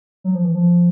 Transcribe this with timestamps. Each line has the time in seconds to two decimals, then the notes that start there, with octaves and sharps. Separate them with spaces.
0.24 F#3
0.35 F3
0.45 E3
0.55 F3